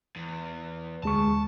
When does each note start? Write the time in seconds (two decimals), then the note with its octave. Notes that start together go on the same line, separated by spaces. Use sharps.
0.16 E2
1.03 D2 G#3 A5 C#6